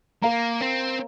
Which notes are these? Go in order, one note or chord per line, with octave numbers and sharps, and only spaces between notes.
A#3 A#4 F5 A#5
C4